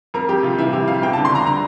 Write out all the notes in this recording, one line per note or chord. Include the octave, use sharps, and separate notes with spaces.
F2 A#4
F2 G4
C3 F4
E3 E4
F2 G4
F2 F5
E2 G5
A5
D3
C6
D3 A#5
A#5